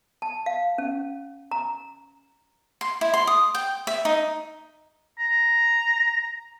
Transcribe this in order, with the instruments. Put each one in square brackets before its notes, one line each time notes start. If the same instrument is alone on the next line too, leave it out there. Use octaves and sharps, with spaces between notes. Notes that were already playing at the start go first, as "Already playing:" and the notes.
[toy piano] A5
F5
C#4
A#5
[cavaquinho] C6
E4
C6
D#6
G5
E5
D#4
[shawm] A#5